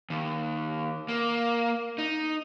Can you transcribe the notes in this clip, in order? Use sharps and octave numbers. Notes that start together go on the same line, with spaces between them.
D#2
A#3
D#4